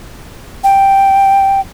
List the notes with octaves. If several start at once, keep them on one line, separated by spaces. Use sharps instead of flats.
G5